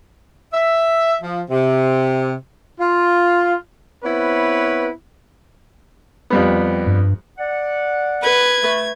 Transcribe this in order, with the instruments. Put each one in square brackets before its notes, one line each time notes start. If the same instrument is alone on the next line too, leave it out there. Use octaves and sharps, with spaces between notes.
[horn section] E5
F3
C3
F4
B3 C4 E4 B4 C#5
[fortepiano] F2 G3 B3
[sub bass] G2
[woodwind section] D5 F#5
[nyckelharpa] B4 [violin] G#6
[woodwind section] A3